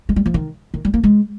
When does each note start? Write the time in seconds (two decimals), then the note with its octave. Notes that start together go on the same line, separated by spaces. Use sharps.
0.09 G#3
0.16 G3
0.26 F3
0.34 D#3
0.74 D#3
0.85 G3
0.94 A#3
1.03 G#3